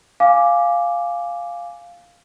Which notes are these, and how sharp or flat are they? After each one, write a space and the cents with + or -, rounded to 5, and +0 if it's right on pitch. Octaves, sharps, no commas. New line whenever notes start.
F5 +0 G#5 +0 D6 +0